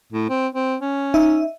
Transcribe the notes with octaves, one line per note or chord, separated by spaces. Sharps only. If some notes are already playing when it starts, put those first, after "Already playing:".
A2
C4
C4
C#4
D#4 E5